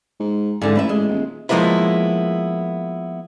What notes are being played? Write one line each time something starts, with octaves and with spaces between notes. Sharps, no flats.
G#2
G#2 D3 E3
A1 E4 B4 E5
G#3
D#1
F3 G#3 A#3 B3 E4